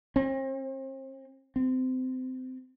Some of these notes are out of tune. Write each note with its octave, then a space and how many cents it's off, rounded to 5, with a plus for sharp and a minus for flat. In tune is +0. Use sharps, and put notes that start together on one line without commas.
C4 +40
C4 -25